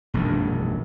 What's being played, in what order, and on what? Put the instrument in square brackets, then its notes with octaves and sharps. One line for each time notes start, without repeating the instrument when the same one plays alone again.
[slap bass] E1 A#1 F#2 D#3